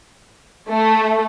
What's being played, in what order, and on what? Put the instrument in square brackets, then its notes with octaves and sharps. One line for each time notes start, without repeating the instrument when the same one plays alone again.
[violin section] A3